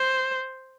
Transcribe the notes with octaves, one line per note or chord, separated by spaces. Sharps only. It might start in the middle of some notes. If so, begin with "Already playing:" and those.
Already playing: C5